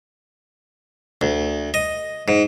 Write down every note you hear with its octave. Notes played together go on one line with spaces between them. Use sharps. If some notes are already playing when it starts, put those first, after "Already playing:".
D2
D#5
G#2